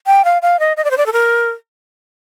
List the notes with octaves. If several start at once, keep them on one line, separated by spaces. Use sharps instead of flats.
G5
F5
F5
D#5
D#5
D5
C5
D5
A4
A#4